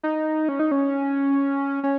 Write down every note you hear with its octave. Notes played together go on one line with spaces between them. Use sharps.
D#4
C#4
D#4
C#4
C#4